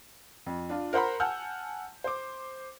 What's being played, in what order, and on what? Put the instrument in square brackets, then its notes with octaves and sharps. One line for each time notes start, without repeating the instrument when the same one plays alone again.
[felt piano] F2
D4 F4
A#4 C5 F#5 A#5 B5
F#5 G#5 A5 E6 F6 G6
C5 D6